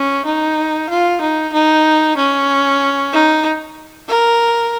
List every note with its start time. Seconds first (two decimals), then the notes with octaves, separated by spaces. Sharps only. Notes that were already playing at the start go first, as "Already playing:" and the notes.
Already playing: C#4
0.26 D#4
0.90 F4
1.21 D#4
1.53 D#4
2.17 C#4
3.13 D#4
4.08 A#4